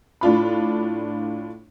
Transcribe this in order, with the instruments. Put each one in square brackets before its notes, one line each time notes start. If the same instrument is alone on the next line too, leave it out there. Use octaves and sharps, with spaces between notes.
[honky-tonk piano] A2 D4 F4 B5